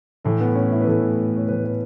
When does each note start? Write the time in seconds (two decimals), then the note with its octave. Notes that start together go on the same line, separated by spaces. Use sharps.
0.25 A2 E3 A3
0.41 B3
0.55 C#4
0.72 E4
0.81 B4
0.87 A2 E3 A4
1.37 C#5
1.48 A2 E3 B4
1.64 B4